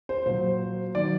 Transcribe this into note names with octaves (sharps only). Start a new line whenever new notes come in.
C5
A#2 F#3 C5
D#3 F#3 D5